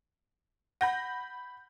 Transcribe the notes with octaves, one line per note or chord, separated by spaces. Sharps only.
F#5 B5 G6 A#6